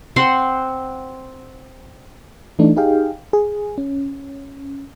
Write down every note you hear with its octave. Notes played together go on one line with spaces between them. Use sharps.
C4 C5 F#5 C6
E3 A3 D4 D#4
D#4 G4 G#4 F5 G5
G#4
C#4